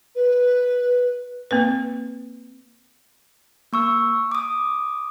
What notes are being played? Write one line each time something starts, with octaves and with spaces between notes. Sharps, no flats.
B4
A#3 C4 B4
A#3 C#6 E6
D6 D#6